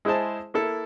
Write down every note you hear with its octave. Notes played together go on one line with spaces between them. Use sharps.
G#3 E4 G#4 C5 A5
A#3 E4 A4